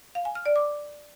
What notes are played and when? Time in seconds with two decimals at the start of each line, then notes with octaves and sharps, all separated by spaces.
0.15 F5
0.25 G#5
0.35 F6
0.46 D5
0.56 D6